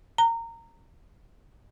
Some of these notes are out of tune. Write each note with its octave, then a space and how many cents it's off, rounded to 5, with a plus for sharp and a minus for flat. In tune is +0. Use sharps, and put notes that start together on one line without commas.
A#5 -20